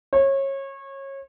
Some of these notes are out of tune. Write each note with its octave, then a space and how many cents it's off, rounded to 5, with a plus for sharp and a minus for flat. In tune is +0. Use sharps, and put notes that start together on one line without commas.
C#5 -25